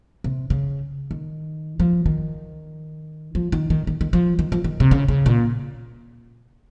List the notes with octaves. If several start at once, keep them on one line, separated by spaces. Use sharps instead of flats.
C3
C#3
D#3
F3
D#3
F3
D#3
D#3
D#3
D#3
F3
D#3
F3
D#3
C3
C#3
C#3
A#2